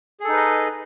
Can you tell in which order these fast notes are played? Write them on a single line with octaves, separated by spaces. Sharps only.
G#4 A4 D#4 B4 D#5